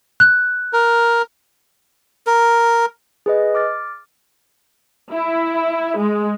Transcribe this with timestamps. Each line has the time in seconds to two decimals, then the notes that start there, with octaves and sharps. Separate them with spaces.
0.20 F#6
0.73 A#4
2.27 A#4
3.26 G#4 B4 D#5
3.55 D6 F6 A6
5.12 E4
5.99 G#3